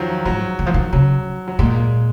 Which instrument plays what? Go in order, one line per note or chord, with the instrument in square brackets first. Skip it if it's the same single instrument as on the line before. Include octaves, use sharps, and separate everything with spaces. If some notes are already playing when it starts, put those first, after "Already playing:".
Already playing: [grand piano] D#3 F3 F#3
[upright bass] G#2 [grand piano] F#3
[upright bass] D#3
F3
D#3
[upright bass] C#3 [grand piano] F#3
[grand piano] F#3
[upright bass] A#2 [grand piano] G#3